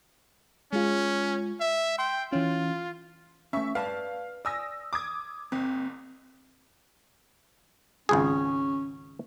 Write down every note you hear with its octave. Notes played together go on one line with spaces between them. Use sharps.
G#3 C#4 F4
E5
G5 C6
E3 C#4 F4
A3 C#4 E5 C#6
B4 D5 F5 A5
D5 G#5 D#6 E6 A#6
D6 D#6 G#6
F#1 C4
G#1 C#2 C#4 G#4